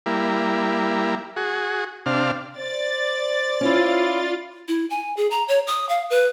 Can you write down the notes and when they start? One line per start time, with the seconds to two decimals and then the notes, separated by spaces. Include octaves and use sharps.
0.06 G3 A#3 E4
1.36 F#4 G#4
2.06 C3 D4 F5
2.58 C5 D5 A6
3.61 C#4 E4 F4
4.68 E4
4.90 G#5
5.17 G#4
5.31 A#5
5.48 C#5
5.67 D#6
5.89 F5
6.10 B4